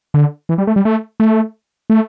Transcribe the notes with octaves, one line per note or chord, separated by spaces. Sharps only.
D3
E3
G3
A3
G3
A3
A3
A3